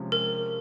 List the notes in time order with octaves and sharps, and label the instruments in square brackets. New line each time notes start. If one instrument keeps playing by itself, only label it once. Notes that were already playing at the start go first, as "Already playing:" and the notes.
Already playing: [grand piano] C3 F3 G#3 C#4
[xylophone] A#4